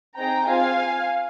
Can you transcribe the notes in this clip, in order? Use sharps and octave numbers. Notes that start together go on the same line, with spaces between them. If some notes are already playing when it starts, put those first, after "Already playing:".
C4 D#4 G#4 G5 A#5
C4 F4 G#4 F5 G#5